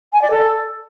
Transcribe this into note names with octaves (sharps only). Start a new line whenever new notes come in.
G#5
D5
A4